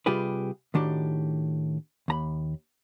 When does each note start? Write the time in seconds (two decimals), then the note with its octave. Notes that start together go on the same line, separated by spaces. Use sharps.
0.06 C3 G3 F4 G4 G#4 B4
0.74 A2 D#3 D4 F#4 G4
2.08 D#2 A#5 B5